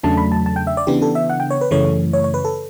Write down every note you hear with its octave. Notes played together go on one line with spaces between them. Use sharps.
E2 C#3 F#3 A3 D4 A5
B5
A5
A5
G5
E5
D5
C#3 E3 B3 D4 G4
A4
E5
F#5
G5
C#5
B4
F#2 C#3 E3 A3 C#5
C#5
C#5
B4
A4